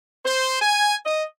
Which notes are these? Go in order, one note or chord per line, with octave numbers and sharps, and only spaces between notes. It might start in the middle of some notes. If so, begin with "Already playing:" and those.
C5
G#5
D#5